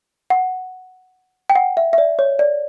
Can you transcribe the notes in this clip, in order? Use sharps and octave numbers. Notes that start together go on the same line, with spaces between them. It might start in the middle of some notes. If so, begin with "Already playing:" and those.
F#5
G5
F#5
E5
E5
D5
C#5
D5